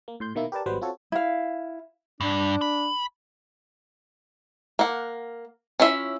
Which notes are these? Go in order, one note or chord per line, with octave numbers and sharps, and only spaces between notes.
A#3
A2 C6 G6
B2 D#3 A#3 E4
G4 A#4 B4 D5 A5
G#1 F#3 G3 B3 B4 C5
C4 F4 F#4 A4 C#5
E4 F5
G2 D4
B5
A#3 F#5
C#4 E4 F4 E5